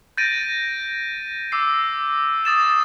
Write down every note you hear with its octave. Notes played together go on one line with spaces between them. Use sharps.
G6 A6 A#6 D7 D#7
D6 E6 C7
D#6 A6 E7